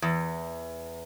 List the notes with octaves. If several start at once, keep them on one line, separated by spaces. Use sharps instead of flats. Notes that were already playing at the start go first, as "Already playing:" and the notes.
E2